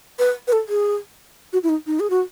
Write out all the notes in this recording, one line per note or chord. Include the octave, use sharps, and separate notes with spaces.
B4
B4
A4
G#4
F#4
E4
D#4
D#4
G#4
F#4